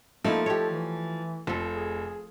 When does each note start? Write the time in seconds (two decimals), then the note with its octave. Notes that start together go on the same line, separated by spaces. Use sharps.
0.24 F3 A3 A#3 D#4 E4
0.46 G4 A4 C#5
0.70 E3
1.47 F1 F3 A4
1.72 G#4